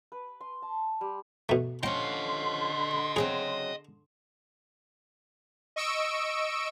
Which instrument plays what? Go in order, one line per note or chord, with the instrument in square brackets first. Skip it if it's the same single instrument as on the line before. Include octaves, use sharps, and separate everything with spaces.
[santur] B4
C6
A5
G3
[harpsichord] B2 A3
[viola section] D3 C6 [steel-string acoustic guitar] F3 C#4 [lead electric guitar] D#5 F#5 [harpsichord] G5
[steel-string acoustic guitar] C#3 F#3 C4 [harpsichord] G#4
[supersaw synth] D#5 C#6 E6 D7